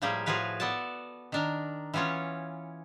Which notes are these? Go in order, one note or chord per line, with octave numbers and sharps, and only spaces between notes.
A2 F3 G3 A#3 G4 G#4
A2 F3 F#4 G#4 B4 F5
B3 A4 D5 F#5 A5
D#3 D4 A#4
E3 B3 C#4 F4 C#5